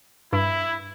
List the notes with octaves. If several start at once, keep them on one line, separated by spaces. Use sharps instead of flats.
G2 E4